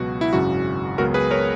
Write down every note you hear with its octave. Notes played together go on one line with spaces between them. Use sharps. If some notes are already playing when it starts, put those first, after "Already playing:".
Already playing: C#2 B2 F#3 B3 F#4
E4
G#1 F#2 C#3 F#4
C#2 C#3 F#3 B3 F#4 A#4
G#4 B4
A#4 C#5